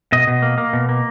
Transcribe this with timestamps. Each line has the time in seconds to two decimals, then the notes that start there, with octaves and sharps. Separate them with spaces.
0.12 B2 D#5
0.27 B2
0.42 A#3
0.58 A#3
0.73 B2
0.89 A#3